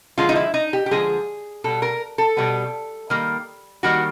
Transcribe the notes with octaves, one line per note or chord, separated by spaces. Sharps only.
D3 F3 G#3 F4
D#4
E4
D#4
G4
G4
D3 F3 G#3 G#4
B2 G3 B3 A4
A#4
A4
B2 G3 B3
D#3 G3 A#3
D#3 G3 A#3 F#4